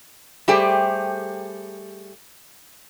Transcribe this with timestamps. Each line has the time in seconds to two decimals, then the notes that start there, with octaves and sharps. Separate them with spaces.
0.48 G3 A3 G4 G#4 C5 G5